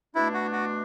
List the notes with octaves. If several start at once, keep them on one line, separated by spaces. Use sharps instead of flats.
B2 A3 D4 E4
F#4
F#4